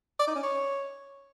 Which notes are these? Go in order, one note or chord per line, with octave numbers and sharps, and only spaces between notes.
D5
D#4
C#4
C#5